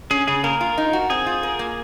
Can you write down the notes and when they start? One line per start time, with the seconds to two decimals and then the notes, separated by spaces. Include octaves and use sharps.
0.11 C#4 G#4
0.27 C#3 G#4
0.44 A#3 A#4
0.61 F4
0.78 D#4
0.93 F#4
1.10 C4 G#4
1.26 F4
1.43 A#4
1.59 A#3